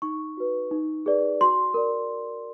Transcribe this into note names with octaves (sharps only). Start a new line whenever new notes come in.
D#4 C#6
F#4 B4
D#4
G#4 B4 D5
F#4 C6
A#4 D5